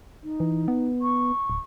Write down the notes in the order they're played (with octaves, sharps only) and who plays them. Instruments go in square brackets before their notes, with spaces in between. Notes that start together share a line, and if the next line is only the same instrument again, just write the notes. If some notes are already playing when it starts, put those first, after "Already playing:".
[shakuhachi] D#4
[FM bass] E3
B3
[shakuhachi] C#6
[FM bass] D1